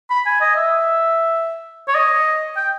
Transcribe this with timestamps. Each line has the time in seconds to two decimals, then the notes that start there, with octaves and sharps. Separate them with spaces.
0.10 B5
0.26 G#5
0.41 D#5
0.56 E5
1.88 C#5
1.95 D#5
2.56 G5